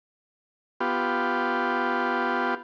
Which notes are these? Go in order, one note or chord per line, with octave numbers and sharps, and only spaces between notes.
B3 F4 G4